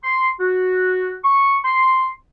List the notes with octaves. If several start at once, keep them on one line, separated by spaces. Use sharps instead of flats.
C6
F#4
C#6
C6